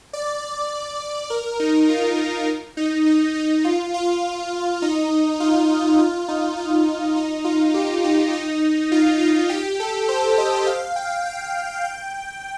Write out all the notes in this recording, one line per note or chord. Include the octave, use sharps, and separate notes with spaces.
D5
A#4
D#4
F4
D#4
D#4
D#4
D#4
F4
F4
D#4
F4
F4
D#4
F4
D#4
F4
G4
D#4
D#4
F4
F4
G4
A4
C5
D#5
F5
G5
G5
G5